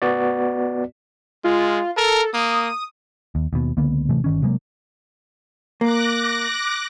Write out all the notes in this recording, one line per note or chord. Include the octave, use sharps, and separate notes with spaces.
B3 F#4 D5
G#3 F4
A4 A#4
A#3 D#6
D#2
D#2 B2
C#2 D3 A#3 B3
A1 C3 E3 A3
G1 D#3 C#4
C3 F#3 G#3 A#3
A#3 D6 F#6 A#6